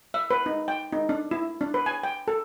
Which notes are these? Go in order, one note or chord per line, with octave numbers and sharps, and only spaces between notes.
E5
B4
D#4
G5
D#4
D4
E4
D4
B4
G#5
G5
A4